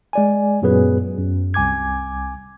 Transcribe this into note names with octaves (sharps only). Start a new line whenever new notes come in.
G#3 D5 G#5
F#2 A#2 F#3 B3 G#4 B4
F#2
C2 G#5 D6 G#6